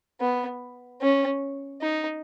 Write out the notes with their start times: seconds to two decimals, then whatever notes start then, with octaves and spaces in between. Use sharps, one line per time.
0.21 B3
1.01 C#4
1.81 D#4